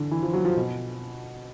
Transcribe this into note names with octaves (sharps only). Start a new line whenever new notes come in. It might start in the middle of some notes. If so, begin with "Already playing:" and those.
Already playing: D3 E3
E3
F3
F#3
F3
B2